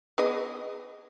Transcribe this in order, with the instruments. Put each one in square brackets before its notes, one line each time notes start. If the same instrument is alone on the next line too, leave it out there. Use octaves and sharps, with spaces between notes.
[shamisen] B3 G#4 D#5